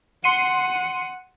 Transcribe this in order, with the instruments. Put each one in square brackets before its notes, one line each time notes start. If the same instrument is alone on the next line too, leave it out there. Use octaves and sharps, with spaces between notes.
[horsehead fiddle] F#5 [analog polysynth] C6 C#7 D#7